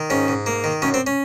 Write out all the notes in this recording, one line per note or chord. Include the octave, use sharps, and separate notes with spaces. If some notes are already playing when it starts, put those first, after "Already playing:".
Already playing: D#3
G#2 C#4
G#2
A#3
D#3
F#2 C#4
C4
C#4